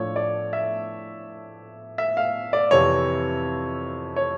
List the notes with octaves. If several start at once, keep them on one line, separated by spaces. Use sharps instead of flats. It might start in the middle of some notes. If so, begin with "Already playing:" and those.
Already playing: A2 F3 A3 D4 C#5
D5
E5
E5
F5
D5
F2 C3 E3 C#5
C#5